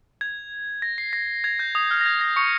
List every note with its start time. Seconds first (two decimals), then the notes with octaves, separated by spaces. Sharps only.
0.21 G#6
0.82 A#6
0.98 C7
1.13 A#6
1.44 G#6
1.59 G6
1.75 D#6
1.91 F6
2.01 A#6
2.06 G#6
2.21 A#6
2.36 C#6 C#7